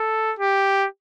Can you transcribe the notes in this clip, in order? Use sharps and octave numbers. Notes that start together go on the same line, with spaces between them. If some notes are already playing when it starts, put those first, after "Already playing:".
Already playing: A4
G4